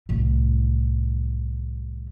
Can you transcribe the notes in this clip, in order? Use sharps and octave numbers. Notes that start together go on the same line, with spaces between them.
C2 A2